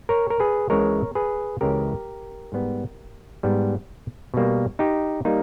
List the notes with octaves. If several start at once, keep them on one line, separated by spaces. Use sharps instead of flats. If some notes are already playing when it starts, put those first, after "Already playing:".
A#4 C#5
A#4
G#4 B4
C#2 C#3 E3 G#3 A#4 C#5
G#4 B4
C#2 C#3 E3 G#3 G4 A#4
G#2 G3 B3
G#2 G3 B3
B2 G3 A#3
D#4 G4
G3 A#3 D#4